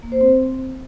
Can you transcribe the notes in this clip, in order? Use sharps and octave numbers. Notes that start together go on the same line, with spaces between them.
A#3
C5
C4